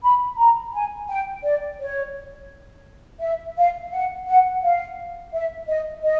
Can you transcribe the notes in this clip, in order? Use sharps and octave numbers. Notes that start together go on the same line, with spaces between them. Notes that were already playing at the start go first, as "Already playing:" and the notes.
B5
A#5
G#5
G5
D5
C#5
E5
F5
F#5
F#5
F5
E5
D#5
D#5